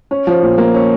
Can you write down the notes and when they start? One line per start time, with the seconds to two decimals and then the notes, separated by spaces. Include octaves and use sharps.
0.11 C#4
0.27 F3
0.43 A#2
0.58 A#3
0.74 C#4